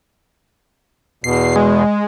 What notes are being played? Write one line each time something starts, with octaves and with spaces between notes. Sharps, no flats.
E2 B2 C7
G#3